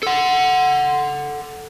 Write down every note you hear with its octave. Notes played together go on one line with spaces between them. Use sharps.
A4 F#5